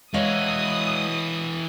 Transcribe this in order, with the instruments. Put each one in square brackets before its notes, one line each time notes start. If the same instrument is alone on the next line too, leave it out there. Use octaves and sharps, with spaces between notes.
[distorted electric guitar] E3 F#4 [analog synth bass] G#3 [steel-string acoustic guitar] C#5 D#5 F5 [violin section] D#6